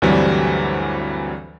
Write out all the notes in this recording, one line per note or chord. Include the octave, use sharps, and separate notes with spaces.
D2 G2 E3 F#3 G3 C4